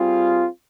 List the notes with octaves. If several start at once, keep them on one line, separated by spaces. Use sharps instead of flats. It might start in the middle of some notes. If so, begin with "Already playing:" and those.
Already playing: G3 C4 F4 G#4